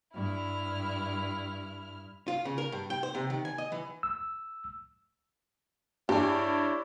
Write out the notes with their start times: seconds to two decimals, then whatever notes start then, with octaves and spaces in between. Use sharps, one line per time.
0.14 G2 E4 F6
2.28 F4
2.45 C#3
2.58 A#4
2.72 G2
2.90 G5
3.03 C5
3.15 C3
3.30 D#3
3.45 G#5
3.58 D#5
3.72 E3
4.03 E6
6.09 G2 E4 G4 G#4 C#5 D5